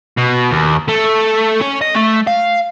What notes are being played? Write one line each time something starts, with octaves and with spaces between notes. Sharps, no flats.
B2
D#2
A3
C#4
D#5
A3
F5